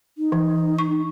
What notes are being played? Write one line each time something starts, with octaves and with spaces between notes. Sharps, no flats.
D#4
E3
C#6